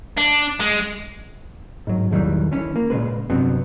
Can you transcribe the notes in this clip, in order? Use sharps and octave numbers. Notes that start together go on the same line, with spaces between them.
D4
G#3
G#2 F#3
B1 E2 D#3 E3 F#3 G3
D#3 E3 C#4
A#3
A#2 C#3 G#3 B4
G2 C3 F#3 B3 C4